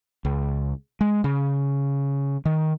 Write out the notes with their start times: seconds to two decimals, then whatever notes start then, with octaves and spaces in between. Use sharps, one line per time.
0.25 C#2
1.01 G#3
1.24 C#3
2.45 D#3